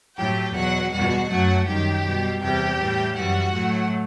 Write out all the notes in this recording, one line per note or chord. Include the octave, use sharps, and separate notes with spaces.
A2 F#3 A3 G4 G5
E2 B2 F#3 F#4 F#5
E2 B2 G3 F#4 F#5
F#2 F#3 A3 F#4 F#5
F#2 D#3 G3 G4 G5
B2 G3
E2 C3 E3 G3 G4 G5
A2 E3 G3
F#2 E3 G3 F#4 F#5
A2 F#3 A3